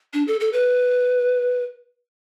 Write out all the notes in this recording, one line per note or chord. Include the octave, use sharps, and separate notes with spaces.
D4
A4
A4
B4